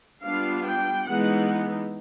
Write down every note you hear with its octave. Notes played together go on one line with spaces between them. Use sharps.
G3 B3 D4 F4 F5
G5
E3 G#3 B3 D#4 F#5